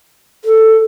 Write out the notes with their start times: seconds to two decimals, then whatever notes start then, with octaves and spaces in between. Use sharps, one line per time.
0.44 A4